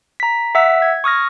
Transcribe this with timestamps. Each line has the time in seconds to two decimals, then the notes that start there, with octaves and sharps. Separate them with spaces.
0.20 A#5 B6
0.55 E5 F#5 E6 B6
0.82 G#6
1.04 C#6 D#6 F6 A#6